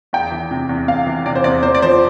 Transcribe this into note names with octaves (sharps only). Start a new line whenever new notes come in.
E2 G5
E3
C3
E2
E2 F5
E3
C3 D5
C5
E2 D5
E2 C5
D5
F3 C5